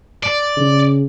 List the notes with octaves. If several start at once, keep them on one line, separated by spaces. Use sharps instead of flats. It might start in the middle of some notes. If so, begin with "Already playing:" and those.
D5
C#3